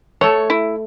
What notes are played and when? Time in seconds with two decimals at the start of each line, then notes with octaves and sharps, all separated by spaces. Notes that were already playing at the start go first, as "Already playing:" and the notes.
0.21 A3 A4 C#5
0.50 E4